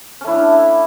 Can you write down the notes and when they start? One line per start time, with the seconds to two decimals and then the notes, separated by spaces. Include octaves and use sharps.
0.21 C#4
0.24 A3
0.27 E4
0.30 D4